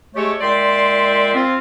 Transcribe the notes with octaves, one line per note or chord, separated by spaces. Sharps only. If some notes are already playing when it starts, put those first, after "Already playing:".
G#3 A3 G4 A4 C#5
A#2 G#3 D5 E5 G5 C6
C4 F4